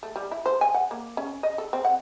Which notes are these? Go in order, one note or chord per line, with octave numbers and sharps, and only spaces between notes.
A3
G3
E4
C5
G#5
F#5
A#3
C#4
D#5
A4
C4
F#5